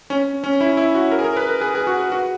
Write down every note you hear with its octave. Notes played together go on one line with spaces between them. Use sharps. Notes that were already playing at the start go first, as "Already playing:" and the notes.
C#4
C#4
E4
E4
F#4
A#4
G#4
A#4
B4
A#4
G#4
G#4
F#4
F#4